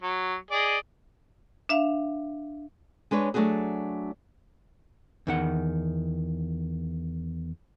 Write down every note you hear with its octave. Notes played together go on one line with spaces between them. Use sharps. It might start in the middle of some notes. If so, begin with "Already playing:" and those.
F#3
G#4 D5 D#5
D4 E5 F5
G#3 D4 B4 C#5
F#3 A3 B3 D4 F#4 G#4
E2 D#3 F#5